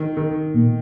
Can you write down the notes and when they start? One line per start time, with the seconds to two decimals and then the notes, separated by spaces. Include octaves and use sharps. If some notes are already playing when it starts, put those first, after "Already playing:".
Already playing: D#3
0.17 D#3
0.54 A#2